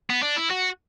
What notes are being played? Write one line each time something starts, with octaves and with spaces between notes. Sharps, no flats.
B3
D4
E4
F#4